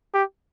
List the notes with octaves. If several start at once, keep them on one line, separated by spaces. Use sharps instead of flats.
G4